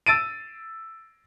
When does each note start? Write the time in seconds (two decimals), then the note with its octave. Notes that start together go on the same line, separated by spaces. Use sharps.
0.06 E6 A6 D7 D#7